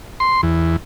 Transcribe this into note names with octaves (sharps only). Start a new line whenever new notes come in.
C6
E2